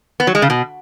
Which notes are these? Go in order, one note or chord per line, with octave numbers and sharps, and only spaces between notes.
B3
F#3
G#3
C#3
B2